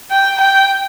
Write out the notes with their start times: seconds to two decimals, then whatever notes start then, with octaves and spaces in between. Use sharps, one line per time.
0.11 G5
0.40 G5